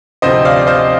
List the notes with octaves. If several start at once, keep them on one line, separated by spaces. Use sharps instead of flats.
D2 C3 F3 C5 D#5
D5 F5
C5 D#5